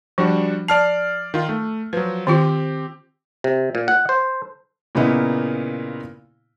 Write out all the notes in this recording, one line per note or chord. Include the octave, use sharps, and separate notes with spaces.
F3 G3 D4 F#4
D5 A5 F6 C7
D#3 F4
A3
F3 F#3 B4
D#3 C4 F4 G4
C3
A#2
F#5
C5
A#2 C#3 A#3 B3 D#4 E4